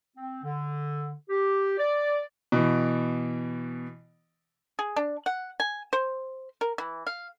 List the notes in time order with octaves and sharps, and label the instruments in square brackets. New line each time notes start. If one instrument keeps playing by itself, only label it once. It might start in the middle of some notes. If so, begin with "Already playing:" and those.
[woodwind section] C4
D3
G4
D5
[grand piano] B2 E3
[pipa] G#4
D4
F#5
G#5
C5
A#4
E3
F5